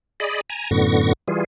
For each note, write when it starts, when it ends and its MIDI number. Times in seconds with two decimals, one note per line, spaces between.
0.20 0.41 68
0.20 0.41 74
0.20 0.41 75
0.20 0.41 83
0.50 0.70 80
0.50 0.70 82
0.71 1.13 42
0.71 1.13 45
0.71 1.13 50
0.71 1.13 59
0.71 1.13 85
0.71 1.13 94
1.28 1.44 52
1.28 1.44 55
1.28 1.44 65
1.28 1.44 68